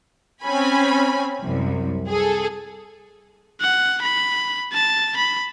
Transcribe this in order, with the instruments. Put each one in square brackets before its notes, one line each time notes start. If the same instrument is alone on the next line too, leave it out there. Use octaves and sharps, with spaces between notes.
[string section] C4 C#4 G#5 B5
C2 F#2
G#4 A4
[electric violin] F#5
B5
A5
B5